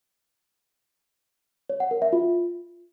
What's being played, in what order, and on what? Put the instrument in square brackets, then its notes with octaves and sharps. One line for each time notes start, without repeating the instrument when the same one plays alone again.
[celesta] C#5
F#5
A#4
E5
F4